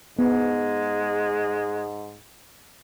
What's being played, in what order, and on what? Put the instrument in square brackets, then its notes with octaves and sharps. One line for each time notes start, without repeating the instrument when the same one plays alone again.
[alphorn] G#2 [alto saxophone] G#3 [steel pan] B3